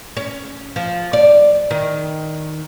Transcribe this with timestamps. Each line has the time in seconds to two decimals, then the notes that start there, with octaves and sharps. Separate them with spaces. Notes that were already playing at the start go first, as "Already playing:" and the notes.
0.17 C#4
0.76 F3
1.13 D5
1.71 D#3